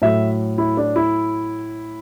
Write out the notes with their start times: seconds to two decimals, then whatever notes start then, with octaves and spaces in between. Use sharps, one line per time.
0.02 A2 F#3 A3 E5
0.58 E4
0.77 D4
0.96 E4